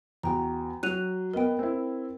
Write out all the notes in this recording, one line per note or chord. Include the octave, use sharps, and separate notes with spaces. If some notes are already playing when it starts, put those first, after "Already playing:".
E2 F#4 G5 A#5
F#3 F#6 D#7 F7
B3 A#4 D#5 G5
C4 E4